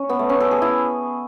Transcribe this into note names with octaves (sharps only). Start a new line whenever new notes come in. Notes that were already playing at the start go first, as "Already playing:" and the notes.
Already playing: C#4
B3
A3
C#4
A4
G#4
E4